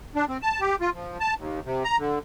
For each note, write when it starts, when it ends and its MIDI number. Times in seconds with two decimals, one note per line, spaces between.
0.15 0.25 62
0.29 0.37 60
0.42 0.60 81
0.60 0.76 67
0.81 0.90 65
0.94 1.18 53
1.20 1.34 81
1.37 1.60 39
1.65 1.83 48
1.84 1.97 82
1.98 2.19 50